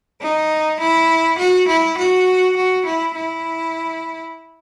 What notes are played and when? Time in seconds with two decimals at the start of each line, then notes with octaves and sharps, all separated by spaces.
0.21 D#4
0.80 E4
1.38 F#4
1.68 E4
1.98 F#4
2.56 F#4
2.86 E4
3.15 E4